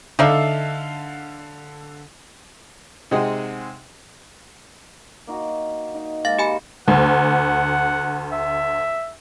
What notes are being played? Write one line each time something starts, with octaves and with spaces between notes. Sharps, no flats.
D3 D#4 A4 D5 E5 F5
C3 G#3 C4 D#4 G#4 F#5
A#3 D#4 F#4
D#4
G#3 A#3 F5 A6
G4 G#5 B5
D2 F#5
E5